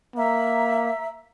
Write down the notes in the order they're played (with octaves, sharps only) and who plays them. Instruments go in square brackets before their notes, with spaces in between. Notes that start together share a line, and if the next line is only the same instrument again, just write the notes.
[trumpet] A#3 [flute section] E5 A#5 E6